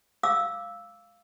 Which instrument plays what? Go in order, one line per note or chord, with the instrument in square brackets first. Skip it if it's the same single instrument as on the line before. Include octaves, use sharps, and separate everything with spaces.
[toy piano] F5 D6 E6